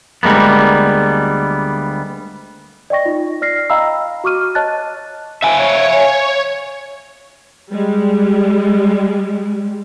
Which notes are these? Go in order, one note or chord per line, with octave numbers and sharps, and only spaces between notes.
D2 G3 G#3 A#3 B3
D5 D#5 G5 C#6 A#6
D#4 F4
D5 F6 A#6 C7
D#5 F5 G5 A#5 B5 E6
F#4 C#6 D6 F6 D#7
C#5 D#5 A5 F#6 A6
C#5 E5 F5 G#5
G3 G#3